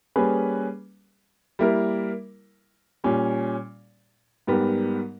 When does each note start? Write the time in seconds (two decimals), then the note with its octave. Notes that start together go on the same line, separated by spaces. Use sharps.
0.16 G3 A#3 C#4 G#4 B4
1.59 G3 A#3 E4 A#4
3.04 A#2 G3 C#4
4.47 G#2 G3 B3 G4 A#4